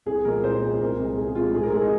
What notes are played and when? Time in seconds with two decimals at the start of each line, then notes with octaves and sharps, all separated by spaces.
0.06 C2 G#4
0.25 A#2 G#3 A#4
0.44 C2 C5
0.62 A#2 G#3
0.80 C2 A#4
0.99 C3 G#3
1.17 C2 G#4
1.28 G#4
1.35 C3 G#3 F4
1.54 G#2 G#4
1.63 A#4
1.73 G#3 G#4
1.82 D#4